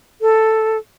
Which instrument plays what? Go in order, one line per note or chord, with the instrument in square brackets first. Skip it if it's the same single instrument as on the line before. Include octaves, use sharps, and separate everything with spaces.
[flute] A4